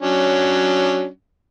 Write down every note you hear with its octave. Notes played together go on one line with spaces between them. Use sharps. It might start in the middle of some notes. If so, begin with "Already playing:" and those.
F#3 C#4 D4